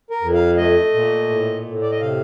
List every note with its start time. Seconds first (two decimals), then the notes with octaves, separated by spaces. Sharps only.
0.10 A#4
0.22 F2
0.34 F5
0.58 A3 D#5
0.94 A#2
1.29 A2
1.65 A2
1.82 D5
1.91 D#5
2.01 C3 F5